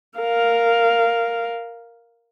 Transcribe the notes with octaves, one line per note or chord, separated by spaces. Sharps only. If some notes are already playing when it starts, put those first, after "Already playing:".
A#4 F5